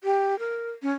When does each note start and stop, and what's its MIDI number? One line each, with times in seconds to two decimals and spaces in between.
0.04 0.38 67
0.39 0.70 70
0.82 0.92 61